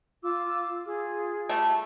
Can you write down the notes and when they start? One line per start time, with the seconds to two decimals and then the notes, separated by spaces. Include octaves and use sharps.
0.22 F4 D6 E6
0.85 F4 G#4
1.49 G3 A3